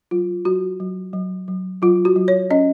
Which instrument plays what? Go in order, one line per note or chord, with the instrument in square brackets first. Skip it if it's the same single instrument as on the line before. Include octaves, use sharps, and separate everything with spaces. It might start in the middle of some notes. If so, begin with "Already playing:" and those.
[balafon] F#3 F4
F#3 F#4
F#3
F#3
F#3
F#3 F4
F#4
F#3
C#5
C#4 D#5